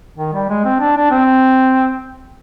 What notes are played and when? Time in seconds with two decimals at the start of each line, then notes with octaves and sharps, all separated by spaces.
0.18 D#3
0.33 G3
0.49 G#3
0.65 C4
0.80 D4
0.96 D4
1.11 C4